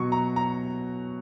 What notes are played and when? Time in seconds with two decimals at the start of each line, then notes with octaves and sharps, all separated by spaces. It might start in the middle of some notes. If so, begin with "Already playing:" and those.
Already playing: B2 F#3 C#6
0.12 A#5
0.36 A#5